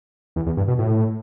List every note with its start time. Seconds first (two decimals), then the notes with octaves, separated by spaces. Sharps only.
0.36 E2
0.46 E2
0.57 G2
0.68 B2
0.79 A2